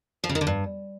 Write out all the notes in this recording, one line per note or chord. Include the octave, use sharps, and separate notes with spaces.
F3
C#3
D#3
D3
G2